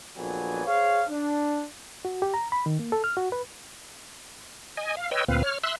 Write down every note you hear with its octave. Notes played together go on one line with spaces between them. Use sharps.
A#1 F2 F#3 B3 D5 G#5
G#4 C5 C#5 F5
D4
F#4
G4
A#5
B5
D#3
A#3
A4
F6
F#4
B4
D#5 G#5
F5
B4 C#5 D#5 G5 E6
D2 A#2 C4 B4 F5
C#5 F6
E5 C6 E6 F#6